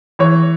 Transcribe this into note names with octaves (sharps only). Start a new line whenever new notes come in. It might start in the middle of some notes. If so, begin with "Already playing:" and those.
E3 C#5